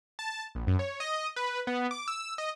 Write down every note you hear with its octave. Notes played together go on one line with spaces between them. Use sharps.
A5
A#1
F#2
C#5
D#5
B4
B3
D6
E6
D#5